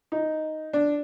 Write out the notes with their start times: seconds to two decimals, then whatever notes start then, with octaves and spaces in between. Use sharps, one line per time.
0.12 D#4
0.73 D4